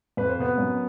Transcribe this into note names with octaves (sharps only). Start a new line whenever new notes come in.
F2 B4
C5
C3 B3 B4
F#2